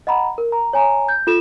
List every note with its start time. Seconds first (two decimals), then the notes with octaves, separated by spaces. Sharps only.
0.07 D#5 F#5 A#5 B5
0.38 A#4
0.52 A#5
0.73 C#5 G#5 A#5
1.09 G6
1.27 F4 A4 E7